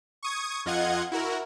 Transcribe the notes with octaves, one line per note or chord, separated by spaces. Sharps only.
C#6 D#6 G#6
F2 F4 D#5 F#5 G#6
E4 F#4 A#4